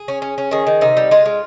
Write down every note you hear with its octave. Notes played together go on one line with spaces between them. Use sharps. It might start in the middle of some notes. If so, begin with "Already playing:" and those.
Already playing: G#4
C#4
C#4
C#4
D#3 G#4
D#3
C3 D#4
G3
G#3 F4
G#3